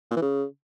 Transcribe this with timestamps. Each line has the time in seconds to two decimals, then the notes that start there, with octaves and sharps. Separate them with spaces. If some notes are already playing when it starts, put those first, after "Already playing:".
0.11 A#2
0.16 E3
0.22 C#3